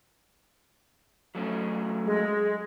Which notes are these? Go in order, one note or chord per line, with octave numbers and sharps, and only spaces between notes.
F#3 A3 C#4
G#3